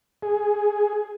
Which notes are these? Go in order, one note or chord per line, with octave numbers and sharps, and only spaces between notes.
G#4